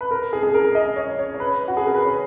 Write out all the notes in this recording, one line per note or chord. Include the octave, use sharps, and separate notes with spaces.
B4
A#4
G#4
G#4
A#4
D#5
C#5
C#5
C#5
B4
F#4
G#4
A#4
B4
C#5